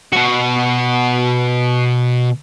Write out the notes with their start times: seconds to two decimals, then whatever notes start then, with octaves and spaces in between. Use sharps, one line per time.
0.13 B2 F#4